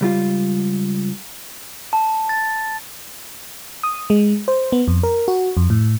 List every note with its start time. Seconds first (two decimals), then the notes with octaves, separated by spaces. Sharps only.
0.01 C#2 G3 F4
1.93 A5
2.29 A6
3.83 D#6
4.10 G#3
4.48 C5
4.72 B3
4.88 F2
5.03 A#4
5.28 F#4
5.57 F2
5.70 A2